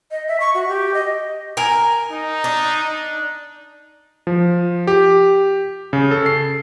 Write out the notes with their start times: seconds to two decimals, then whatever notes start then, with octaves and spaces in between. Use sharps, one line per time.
0.11 D#5
0.28 E5
0.40 C#6
0.54 F#4
0.69 G4
0.94 D#5
1.57 A#4 G#5
2.12 D#4
2.44 D4
4.27 F3
4.87 G4
5.93 C#3
6.11 A4
6.26 C7